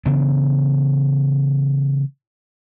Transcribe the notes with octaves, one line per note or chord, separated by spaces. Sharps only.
C#3 E3 B3 D4